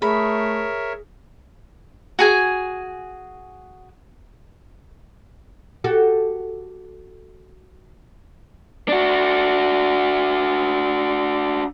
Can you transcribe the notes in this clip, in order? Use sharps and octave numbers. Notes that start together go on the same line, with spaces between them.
A3 G#4 A#4 C#5 E5 B5
F#4 G#4 G#5
F#4 G4 A4
D4 F#4